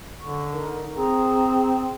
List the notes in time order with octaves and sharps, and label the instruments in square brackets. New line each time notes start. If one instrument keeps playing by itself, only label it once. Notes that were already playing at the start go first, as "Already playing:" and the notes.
[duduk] D3 [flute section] C#6
[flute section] D#4 A#4
[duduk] C4 [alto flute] G#4 [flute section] A#5